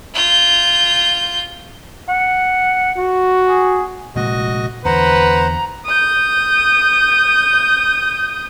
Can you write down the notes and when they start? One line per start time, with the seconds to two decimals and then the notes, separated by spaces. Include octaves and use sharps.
0.14 F4 G6
2.09 F#5
2.97 F#4
3.47 G#4
4.16 F1 A#2 G#3 F#4 D#5
4.85 E2 D3 B4 C5 F#5 A#5
5.86 D#6 G6